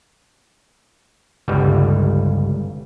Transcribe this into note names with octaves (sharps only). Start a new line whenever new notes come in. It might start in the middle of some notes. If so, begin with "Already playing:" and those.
G1 C#2 G3